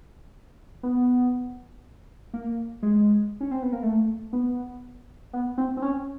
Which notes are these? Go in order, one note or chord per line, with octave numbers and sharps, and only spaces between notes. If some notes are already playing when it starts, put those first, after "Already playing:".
B3
A#3
G#3
C#4
C4
B3
A#3
A3
B3
B3
C4
C4
C#4